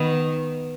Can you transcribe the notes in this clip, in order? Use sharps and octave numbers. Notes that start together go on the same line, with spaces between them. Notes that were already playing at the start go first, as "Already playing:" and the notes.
Already playing: D#3 B3